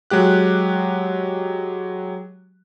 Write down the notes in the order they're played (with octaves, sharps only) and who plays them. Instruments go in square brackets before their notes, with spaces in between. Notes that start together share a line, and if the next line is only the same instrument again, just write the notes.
[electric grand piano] F#3 G#3 G4 F#6